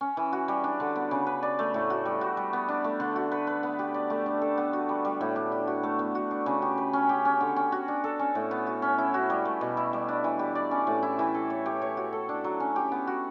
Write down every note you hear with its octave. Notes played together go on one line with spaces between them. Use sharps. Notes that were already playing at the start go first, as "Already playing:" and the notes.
C#4
E3
F#4
G3
D4
D3
B3
C#3
B4
D5
A3
A2
F#4
G3
F#4
G3
B3
D4
A3
D3
F#4
B4
B4
B3
G4
D5
A3
D4
A4
B3
F#4
G3
G3
A2
D4
G4
F#4
A3
B3
F#4
D4
C#3
G4
B4
C#4
G4
C#4
D3
C#4
F#4
D4
A4
C#4
A2
B3
F#4
C#4
E4
F#4
G3
A3
B2
E4
G3
D4
E3
G4
D5
C#4
A2
E4
E3
A4
C#5
G4
C#5
F#4
A4
D4
F#3
C#4
G4
B3
F#4